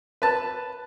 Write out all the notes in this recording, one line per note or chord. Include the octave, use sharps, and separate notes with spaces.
B4 A5